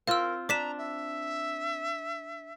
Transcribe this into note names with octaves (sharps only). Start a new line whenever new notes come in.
C4 F4 A#4 F5 E6
D4 A#5 D6 B6 E7
E5